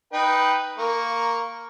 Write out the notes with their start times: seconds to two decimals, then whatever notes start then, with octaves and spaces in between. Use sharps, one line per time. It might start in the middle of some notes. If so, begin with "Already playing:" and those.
0.13 D#4 B4 G5
0.78 A#3 A#4 C#6